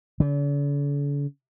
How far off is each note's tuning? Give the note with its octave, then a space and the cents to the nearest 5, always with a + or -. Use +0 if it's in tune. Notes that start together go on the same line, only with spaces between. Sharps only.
D3 -45